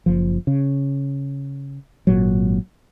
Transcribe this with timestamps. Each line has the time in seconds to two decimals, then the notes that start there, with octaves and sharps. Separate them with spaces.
0.06 F#1 F3
0.47 C#3
2.07 G#1 A#2 F#3